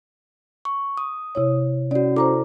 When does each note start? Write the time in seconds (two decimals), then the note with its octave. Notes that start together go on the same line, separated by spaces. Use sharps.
0.65 C#6
0.97 D#6
1.35 C3 E4 C#5
1.91 C#4 F#4 D5
2.16 E4 A4 C5 A#5 D6